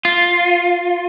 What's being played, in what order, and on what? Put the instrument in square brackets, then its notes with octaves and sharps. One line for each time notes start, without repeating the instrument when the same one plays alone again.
[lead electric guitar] F4